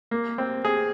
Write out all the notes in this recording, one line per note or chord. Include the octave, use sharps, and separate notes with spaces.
A#3
C4
G#4